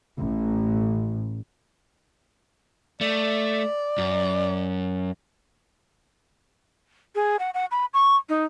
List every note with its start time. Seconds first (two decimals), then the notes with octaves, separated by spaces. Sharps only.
0.18 A1
3.01 A3 D5
3.98 F#2
7.15 G#4
7.39 F#5
7.54 F#5
7.71 B5
7.94 C#6
8.29 D#4